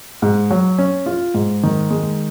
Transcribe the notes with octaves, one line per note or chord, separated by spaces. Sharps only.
G#2
F#3
C#4
F4
G#2
D#3
G#3